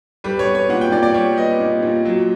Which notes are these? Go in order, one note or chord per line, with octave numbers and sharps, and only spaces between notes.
G3 B4
C#5
B3
C#5
A#2 F#5
G5
A#2 D5
D5
G3 C#5
B3 D#5
A#2
A#2
F#3